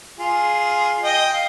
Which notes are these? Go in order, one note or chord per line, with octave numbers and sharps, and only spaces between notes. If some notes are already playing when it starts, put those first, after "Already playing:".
F4 G#4
D#5 G5
F5